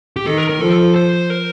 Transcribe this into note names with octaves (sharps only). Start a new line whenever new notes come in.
G4
D#3 A4
A#4
A#4
F3 A4
C5
A#4